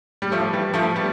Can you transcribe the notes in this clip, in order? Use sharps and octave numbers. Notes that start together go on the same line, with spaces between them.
G3
F3 A3
E3 G3
F3 A3
G3 B3